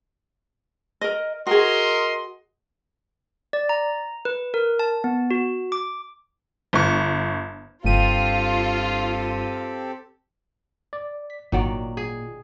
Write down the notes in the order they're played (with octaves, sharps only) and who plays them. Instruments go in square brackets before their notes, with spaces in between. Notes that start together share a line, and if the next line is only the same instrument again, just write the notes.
[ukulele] A#4 D#5
[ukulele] F#4 G#4 [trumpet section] A#4 D#5 C6
[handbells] D5
A#5
B4
A#4
A5
B3
F#4
D6
[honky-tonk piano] G1 C#6
[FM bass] F#1 [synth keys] G2 D#7 [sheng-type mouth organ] C4 G4 A4 [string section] F4
[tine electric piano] D5
[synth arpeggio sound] B6
[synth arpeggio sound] G#1 [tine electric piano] A#2 [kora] D#3 F#3 D5
[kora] G#4